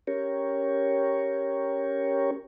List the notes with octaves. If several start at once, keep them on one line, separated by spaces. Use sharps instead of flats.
C#4 G4 A#4 C#5